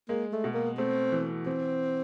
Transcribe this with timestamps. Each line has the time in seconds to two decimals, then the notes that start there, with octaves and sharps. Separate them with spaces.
0.09 G#3 A#3
0.33 A3
0.44 B2
0.54 A#3
0.78 A3 C4
1.12 E3
1.46 E3 C4